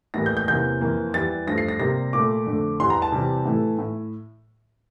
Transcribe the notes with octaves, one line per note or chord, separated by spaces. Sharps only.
A2 E3 G3 A#3 A#6
G6
G6
E2 C3 E3 A#3 G6
F2 E3 A#3
E2 E3 G3 A6
G2 F3 A3 A#6
C7
A#6
C3 G3 A#3 A#6
A#2 A3 D6
F2 D3 A3
E2 E3 G3 C6
A#5
A5
C3 E3 G3
A2 E3 A3
A2